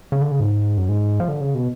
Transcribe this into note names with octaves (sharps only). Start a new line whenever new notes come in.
C#3
D3
C#3
G#2
F#2
G#2
F3
D3
C#3
B2